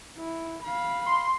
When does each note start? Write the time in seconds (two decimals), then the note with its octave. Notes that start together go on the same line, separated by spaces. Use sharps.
0.18 E4
0.64 F5 B5
1.06 C6